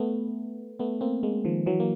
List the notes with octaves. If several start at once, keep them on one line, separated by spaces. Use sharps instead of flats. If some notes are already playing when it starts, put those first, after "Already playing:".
Already playing: A3 B3
A3 B3
A#3 C4
G#3 A#3
D#3 F3
E3 F#3
A#3